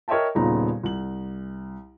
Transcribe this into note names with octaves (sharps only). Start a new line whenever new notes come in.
A#4 C#5 D#5 E5 G5 A5
D#1 A#2 C#3 B3 D#4 A#5
C2 F#7